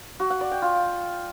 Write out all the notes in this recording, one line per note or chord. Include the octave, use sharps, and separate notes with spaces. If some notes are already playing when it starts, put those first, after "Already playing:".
F#4
F#5
D5
G5
F4